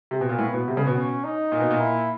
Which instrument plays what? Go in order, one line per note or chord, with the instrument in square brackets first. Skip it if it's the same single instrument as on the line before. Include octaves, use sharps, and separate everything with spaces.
[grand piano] C3
B2
A#2
[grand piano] A2 [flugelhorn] B3
[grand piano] B2
C3
C#3
B2
[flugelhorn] C#4
D#4
[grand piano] A#2
B2
A#2
[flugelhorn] E4